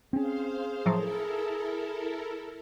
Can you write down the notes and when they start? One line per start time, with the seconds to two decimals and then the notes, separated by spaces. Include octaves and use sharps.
0.13 C4 C#4 G#4 C5 F5
0.86 A2 F3 F#3 E4 A4 A#4